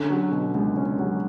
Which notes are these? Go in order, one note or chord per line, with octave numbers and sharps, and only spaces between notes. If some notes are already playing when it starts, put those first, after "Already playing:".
Already playing: D3 C#4
F#3
B2
C#2
C#4
F#3